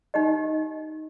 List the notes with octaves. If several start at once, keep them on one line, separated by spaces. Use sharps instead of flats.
D#4 G4 D#5